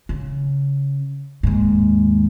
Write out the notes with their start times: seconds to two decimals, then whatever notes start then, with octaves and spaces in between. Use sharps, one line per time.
0.09 C#3
1.43 D#2 G#2